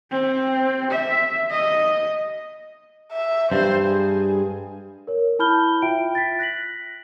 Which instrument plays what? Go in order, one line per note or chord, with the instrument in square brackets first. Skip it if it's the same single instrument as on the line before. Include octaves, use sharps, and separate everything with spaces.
[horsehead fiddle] C4
E5
D#5
[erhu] E5
[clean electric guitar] G2 [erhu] C5
[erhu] G#4
[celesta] A#4 C#5
E4 A5 B5 F6 G6 G7
F4 E5 G5 D7
A6 B6
F#6 A#6 B6 F#7